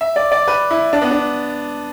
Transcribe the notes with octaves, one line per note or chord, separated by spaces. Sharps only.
E5
D5
D5
B4
E4
D4
B3
D4